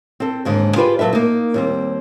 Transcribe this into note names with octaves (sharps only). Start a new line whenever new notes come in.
C4 A4
D#2 G#2 D3
F4 G4 G#4 B4 C5 D5
A#2 F#3 A4 B4 E5
A#3 D#4
D#2 G3 C4